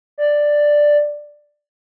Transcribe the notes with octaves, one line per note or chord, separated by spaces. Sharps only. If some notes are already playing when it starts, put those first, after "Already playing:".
D5